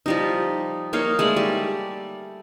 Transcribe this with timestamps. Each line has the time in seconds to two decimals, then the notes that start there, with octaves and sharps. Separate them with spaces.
0.06 F3 G3 D#4
0.93 A#3 D#4 C#5 F5
1.19 G#3 A3 D5
1.36 G3